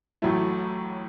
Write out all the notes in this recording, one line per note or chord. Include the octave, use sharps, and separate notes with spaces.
A1 A2 F#3 A3 E4